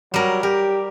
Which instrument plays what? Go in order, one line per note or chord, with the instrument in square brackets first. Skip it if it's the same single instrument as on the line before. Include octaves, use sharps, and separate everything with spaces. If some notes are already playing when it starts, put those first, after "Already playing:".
[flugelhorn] F#3 [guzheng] G3 A#4
[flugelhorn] G4 [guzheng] A#4